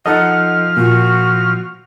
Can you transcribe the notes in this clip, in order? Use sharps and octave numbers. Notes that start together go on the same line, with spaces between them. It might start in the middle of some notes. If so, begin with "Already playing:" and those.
F3 D#4 A4 D#5 F#5 F6
A#2 F#4